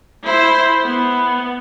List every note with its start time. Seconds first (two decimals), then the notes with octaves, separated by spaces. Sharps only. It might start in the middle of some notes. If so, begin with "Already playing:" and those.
0.24 E4 C5
0.84 B3